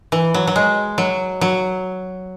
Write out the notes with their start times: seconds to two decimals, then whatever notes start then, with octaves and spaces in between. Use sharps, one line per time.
0.12 E3
0.34 F#3
0.47 F#3
0.56 G#3
0.98 F#3
1.41 F#3